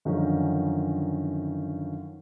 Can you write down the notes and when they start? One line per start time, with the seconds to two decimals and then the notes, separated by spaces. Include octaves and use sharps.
0.05 F#2 D3 D#3 F3 C#4 D#4